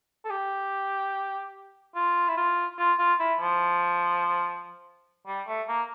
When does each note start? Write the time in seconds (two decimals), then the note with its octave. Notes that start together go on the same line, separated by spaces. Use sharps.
0.25 A4
0.30 G4
1.95 F4
2.28 E4
2.37 F4
2.78 F4
2.99 F4
3.20 E4
3.40 F3
5.27 G3
5.47 A3
5.68 A#3